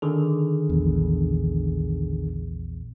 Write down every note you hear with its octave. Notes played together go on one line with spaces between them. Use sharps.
D3 D#3 G#4
A#1 E2